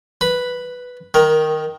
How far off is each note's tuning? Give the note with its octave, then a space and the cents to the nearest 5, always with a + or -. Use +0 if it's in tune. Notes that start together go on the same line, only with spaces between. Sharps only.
B4 +0 B5 +0
D#3 +0 A#4 +20